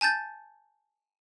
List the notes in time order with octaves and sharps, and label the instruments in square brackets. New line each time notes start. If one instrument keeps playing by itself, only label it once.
[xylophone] G#5 A5 G6 A6